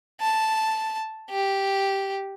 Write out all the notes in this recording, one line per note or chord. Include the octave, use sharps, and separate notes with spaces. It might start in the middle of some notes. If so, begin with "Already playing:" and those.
A5
G4